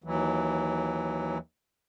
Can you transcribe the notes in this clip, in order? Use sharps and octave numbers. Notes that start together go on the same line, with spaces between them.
D#2 E3 F#3